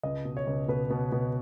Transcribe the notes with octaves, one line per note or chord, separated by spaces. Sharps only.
C#2 D#5
B2
C#5
C#2
B2 B4
B2
B2